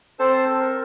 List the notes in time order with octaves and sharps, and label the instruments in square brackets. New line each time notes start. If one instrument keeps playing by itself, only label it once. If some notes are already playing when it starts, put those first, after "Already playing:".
[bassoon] C4 [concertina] A4 C5 A5
[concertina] A#4